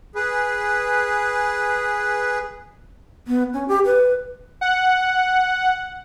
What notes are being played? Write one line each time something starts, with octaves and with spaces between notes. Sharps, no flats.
G#4 B4
B3
C#4
G4
B4
F#5